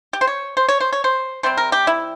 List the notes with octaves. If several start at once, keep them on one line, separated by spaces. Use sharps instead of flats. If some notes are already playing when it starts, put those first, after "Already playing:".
G4
C5
C#5
C5
C#5
C5
C#5
C5
C3 G3 C4 C5
A#4
G4
E4